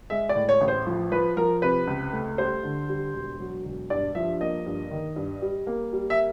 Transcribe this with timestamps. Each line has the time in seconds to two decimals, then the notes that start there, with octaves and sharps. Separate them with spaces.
0.10 G#3 E5
0.29 D5
0.35 A2
0.49 C#5
0.61 A1
0.68 C5
0.86 F3
1.11 F3 B4
1.37 F3 A#4
1.62 C3 B4
1.87 C#2
2.13 A3
2.38 G3 C5
2.63 D3
2.89 G3
3.14 E1
3.39 F#3
3.65 E1
3.90 G2 D5
4.15 F3 E5
4.40 A#3 D#5
4.66 G2
4.91 D#3
5.16 G2
5.42 G3
5.67 A#3
5.93 G3
6.10 E5